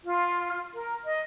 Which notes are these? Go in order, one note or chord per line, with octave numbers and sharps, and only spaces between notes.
F4
A#4
D#5